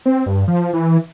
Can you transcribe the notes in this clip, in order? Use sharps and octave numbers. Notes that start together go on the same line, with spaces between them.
C4
G2
F3
E3